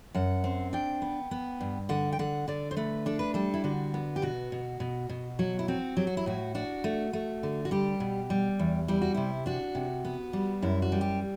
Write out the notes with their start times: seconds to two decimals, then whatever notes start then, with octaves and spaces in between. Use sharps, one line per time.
0.14 F#2 F#5
0.44 C4
0.73 D4 G5
1.02 B3
1.31 B3
1.61 G2
1.89 D3 F#5
2.12 G5
2.19 D3 F#5
2.48 D3 D5
2.71 C5
2.77 A3 B4
3.06 D4 A4
3.19 B4
3.34 G3 A4
3.54 E4
3.64 D3 F#4
3.94 B3
4.16 G4
4.22 B2 F#4
4.52 B2
4.80 B2
5.09 B2
5.39 F#3 F#4
5.59 E4
5.68 C4 F#4
5.97 F#3 G4
6.07 F#4
6.17 E4
6.26 A2 F#4
6.55 D4 F#4
6.84 A3
7.13 A3
7.43 D3
7.65 F#4
7.71 G3 G4
8.00 B2
8.30 G3
8.59 E2
8.88 G3 E4
9.02 F#4
9.15 C3 E4
9.46 D4 F#4
9.75 C3
10.05 B3
10.33 G3
10.62 F#2 E4
10.82 F#4
10.92 G3
11.01 G4